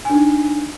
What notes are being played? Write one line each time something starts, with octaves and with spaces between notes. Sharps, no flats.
D4 D#4 G#5